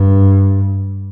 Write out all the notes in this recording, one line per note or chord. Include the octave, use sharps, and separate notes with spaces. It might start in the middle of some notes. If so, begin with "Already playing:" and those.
Already playing: G2